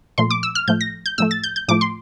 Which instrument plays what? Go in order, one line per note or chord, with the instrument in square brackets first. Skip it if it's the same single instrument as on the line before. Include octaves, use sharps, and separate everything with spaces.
[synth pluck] A#2 F3 A3 C6
D6
E6
F6
A2 F3 A3 G6
A#6
G6
A2 F3 A3 E6
A6
G6
G6
A2 F3 A3 D6
C6